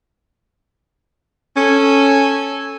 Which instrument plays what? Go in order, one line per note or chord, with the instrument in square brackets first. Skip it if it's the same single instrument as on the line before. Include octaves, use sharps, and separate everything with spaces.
[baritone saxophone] C#4 [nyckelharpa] A4 G#5